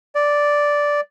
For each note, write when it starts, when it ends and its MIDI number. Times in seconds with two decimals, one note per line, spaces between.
0.15 1.01 74